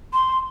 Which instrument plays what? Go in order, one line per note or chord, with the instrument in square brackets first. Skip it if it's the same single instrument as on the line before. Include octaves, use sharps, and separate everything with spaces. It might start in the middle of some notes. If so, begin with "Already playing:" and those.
[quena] C6